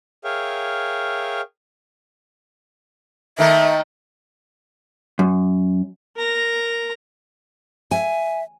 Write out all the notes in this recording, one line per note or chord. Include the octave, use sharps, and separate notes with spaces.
G#4 A#4 C#5 E5 F5 G5
D#3 A3 A#3 E5
F#2
A#4 A#5
E5 G#5